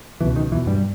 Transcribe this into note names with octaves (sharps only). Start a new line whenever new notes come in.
C#2 B2 E3
D#3
E2 B2 E3
G2 G3